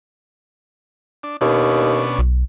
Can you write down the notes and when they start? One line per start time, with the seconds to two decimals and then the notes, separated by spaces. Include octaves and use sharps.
1.23 D4
1.41 D#2 B2 C#4 D4
2.19 B1